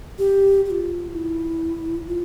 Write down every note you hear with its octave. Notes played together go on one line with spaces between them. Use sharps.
G4
G4
F4
E4
F4